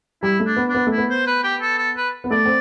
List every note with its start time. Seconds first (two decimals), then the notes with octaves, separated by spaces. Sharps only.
0.23 G3 E4
0.40 A3
0.46 D4
0.57 B3
0.69 D4
0.75 B3
0.87 A3
0.92 E4
0.98 B3
1.10 C5
1.27 B4
1.44 G4
1.62 A4
1.78 A4
1.97 B4
2.24 B3
2.31 A3 D5
2.46 C4